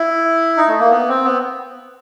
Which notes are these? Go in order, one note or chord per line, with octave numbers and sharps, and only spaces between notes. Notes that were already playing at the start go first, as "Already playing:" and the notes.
Already playing: E4
D#4
A3
A#3
B3
C4
B3